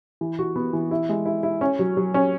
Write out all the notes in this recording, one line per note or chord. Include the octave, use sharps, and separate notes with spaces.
E3
F#4
B3
E3
E4
G#3
E4
E4
C#4
F#3
F#3
C#4